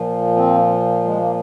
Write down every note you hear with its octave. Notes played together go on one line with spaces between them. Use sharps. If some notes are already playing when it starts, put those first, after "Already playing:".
Already playing: A#2 F3
C4
G#3
A#3